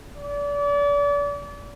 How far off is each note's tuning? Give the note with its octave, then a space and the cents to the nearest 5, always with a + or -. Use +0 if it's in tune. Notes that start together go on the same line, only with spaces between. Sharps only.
D5 -35